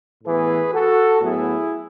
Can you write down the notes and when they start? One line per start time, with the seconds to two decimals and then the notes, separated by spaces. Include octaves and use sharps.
0.24 A2 E3 B3 G#4 B4
0.72 F#4 A4
1.21 A2 F#3 B3 E4 G#4